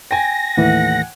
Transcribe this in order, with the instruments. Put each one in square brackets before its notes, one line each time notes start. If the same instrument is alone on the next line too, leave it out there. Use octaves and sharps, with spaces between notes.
[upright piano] G5 G#5 [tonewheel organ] A#6
[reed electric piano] D#2 A2 E3 [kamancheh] F#5